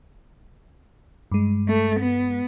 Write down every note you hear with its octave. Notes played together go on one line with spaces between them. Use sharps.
G2 G#3
A3
B3